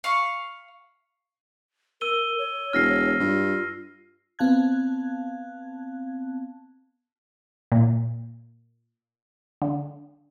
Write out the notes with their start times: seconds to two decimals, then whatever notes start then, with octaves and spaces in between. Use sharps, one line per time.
0.04 F5 B5 C#6
2.01 A#4 E6 D#7 G7
2.38 C#5
2.73 E1 F6 A#6 C7
3.20 G2 F4
4.39 B3 C4 F5 A5 F#6 G#6
7.72 A#2
9.62 D3